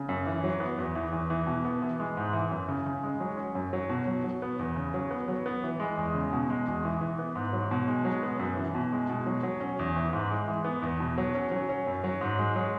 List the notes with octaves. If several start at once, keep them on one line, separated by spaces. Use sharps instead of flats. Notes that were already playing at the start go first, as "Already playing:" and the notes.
Already playing: C#3
F#2
E3
F#3
B3
E2
E3
E2
E3
B2
B3
E3
G#3
G#2
E3
F#2
C#3
C#3
G#3
F#3
C#4
F#2
F#3
B2
F#3
F#3
B3
E2
C#3
F#3
B3
F#3
B3
E3
G#3
E2
C#3
B2
G#3
E2
E3
E3
B3
G#2
F#3
B2
G#3
F#3
B3
F#2
E3
B2
G#3
B2
F#3
F#3
C#4
E2
E3
G#2
G#3
E3
B3
E2
B2
F#3
C#4
F#3
C#4
F#2
F#3
G#2
G#3
F#3